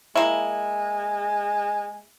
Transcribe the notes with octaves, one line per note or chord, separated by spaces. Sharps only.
G#3 A#3 E4